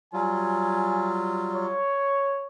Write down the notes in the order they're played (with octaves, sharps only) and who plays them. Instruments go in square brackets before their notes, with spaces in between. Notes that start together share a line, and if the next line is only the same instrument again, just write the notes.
[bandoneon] F#3 G3 F4 [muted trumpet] G#5
[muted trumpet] C#5